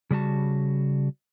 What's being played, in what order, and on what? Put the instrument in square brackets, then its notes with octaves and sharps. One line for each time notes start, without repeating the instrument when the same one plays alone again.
[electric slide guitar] C#3 G3 F#4 A5